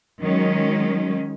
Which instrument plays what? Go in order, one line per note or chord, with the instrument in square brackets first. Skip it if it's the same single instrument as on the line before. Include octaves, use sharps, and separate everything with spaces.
[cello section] D#3 F#3 G#3 C#4